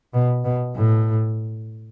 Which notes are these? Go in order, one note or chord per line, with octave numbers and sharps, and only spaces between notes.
B2
B2
A2